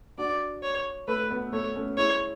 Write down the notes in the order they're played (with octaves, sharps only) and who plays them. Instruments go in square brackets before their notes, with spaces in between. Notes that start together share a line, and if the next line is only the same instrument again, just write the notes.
[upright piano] D4 F#4 [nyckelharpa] D5
[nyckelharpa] C#5
[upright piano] A3 [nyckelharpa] B4
[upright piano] B3
[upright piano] A3 [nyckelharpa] C#5
[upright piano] A3 C#4
[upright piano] E4 G#4 [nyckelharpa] C#5